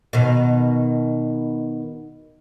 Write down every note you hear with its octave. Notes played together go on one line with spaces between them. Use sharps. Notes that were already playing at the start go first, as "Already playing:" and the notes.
B2 D#3